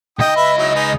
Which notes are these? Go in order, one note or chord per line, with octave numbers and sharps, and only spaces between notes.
C#2 D#4 D#5 G5 D#6
B4 E5 B5
F#3 D#4 E4
D#4 G#4 B4